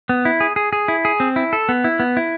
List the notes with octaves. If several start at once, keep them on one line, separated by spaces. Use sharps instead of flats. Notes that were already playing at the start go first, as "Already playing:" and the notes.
B3
E4
G#4
G#4
G#4
E4
G#4
C4
E4
A4
B3
E4
B3
E4